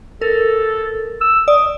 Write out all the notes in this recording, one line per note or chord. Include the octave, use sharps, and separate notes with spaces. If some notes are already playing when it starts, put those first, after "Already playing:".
A4 A#4
E6
D5 D#6